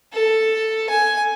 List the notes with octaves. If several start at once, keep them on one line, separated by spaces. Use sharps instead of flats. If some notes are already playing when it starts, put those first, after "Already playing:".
A4
G#5